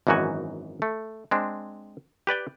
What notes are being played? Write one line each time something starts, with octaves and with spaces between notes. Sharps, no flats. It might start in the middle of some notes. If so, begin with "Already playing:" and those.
G#1 F#2 E3 D#4 F#4 G#5
A3
G#3 C4 D4
G4 B4 D5 G5